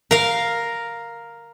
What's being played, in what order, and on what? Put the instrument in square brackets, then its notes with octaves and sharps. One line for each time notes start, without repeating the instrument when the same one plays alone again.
[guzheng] A#4 F5